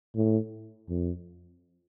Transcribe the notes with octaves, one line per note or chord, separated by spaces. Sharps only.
A2
F2